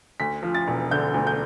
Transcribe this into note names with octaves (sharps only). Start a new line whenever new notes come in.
D2 B6
F3
A6
E1
D3 G6
D2
G6